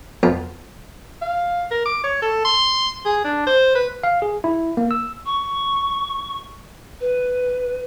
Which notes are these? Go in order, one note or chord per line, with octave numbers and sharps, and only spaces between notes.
F2 B3 F4
F5
A#4
D6
C#5
A4
C6
G#4
D4
C5
B4
F5
G#4
E4
A#3
E6
C#6
B4